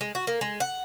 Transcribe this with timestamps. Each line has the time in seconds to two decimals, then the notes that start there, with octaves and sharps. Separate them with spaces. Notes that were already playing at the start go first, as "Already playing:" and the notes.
0.01 G#3
0.15 F#4
0.27 A#3
0.41 G#3
0.60 F#5